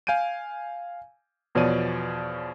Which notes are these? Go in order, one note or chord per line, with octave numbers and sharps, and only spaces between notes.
F5 G#5 G6 D7 D#7
E2 B2 F3 C#5 D5 D#7